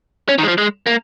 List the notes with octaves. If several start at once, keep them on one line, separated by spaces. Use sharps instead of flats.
C#4
D#3
G#3
F3
G#3
A#3